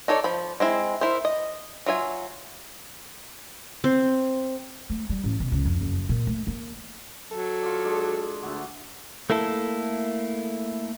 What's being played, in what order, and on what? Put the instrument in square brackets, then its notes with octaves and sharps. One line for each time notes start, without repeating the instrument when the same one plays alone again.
[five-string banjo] D#4 A4 C#5 D5
F3 B5
G#3 C4 E4
E4 A#4 C5
D#5
F#3 F4 E5 G#5
[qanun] C4
[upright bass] A3
G3
A1
B2
C#2
F2
F#1
A#2
A3
A#3
[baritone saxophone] F#3 [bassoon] A4
[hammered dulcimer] F4 D5
G#3 D4
[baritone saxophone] D2 [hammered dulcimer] F#4 E5
[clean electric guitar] A3 A#3 E4 A4